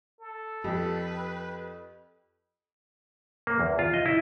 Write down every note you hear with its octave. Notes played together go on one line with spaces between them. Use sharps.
A4
F2 G4 B4
A#3
E2
F4
D#5
E4